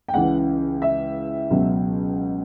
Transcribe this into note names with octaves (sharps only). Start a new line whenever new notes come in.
G5
C#2 C#3 E3 F#5
E5
C#2 B2 F#3